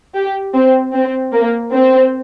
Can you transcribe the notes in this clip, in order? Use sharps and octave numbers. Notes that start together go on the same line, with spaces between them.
G4
C4
C4
A#3
C4